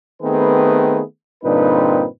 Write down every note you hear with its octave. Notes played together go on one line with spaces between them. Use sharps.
D#3 A3 B3 C4 G#4 B4
G2 A#2 D3 C4 D#4 B4